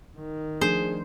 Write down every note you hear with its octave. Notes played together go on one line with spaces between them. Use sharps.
D#3
F3 A3 D4 G#4 C5